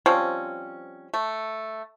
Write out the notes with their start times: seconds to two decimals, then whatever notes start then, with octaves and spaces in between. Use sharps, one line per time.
0.06 F3 G3 C4 C#4
1.14 A3